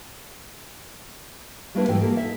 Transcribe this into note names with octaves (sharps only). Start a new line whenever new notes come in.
G3 A3 A#3 D4 E4 B4
G#2 E3 F#3 A3 G4 G5
A#3 G4 A4
D#4 E5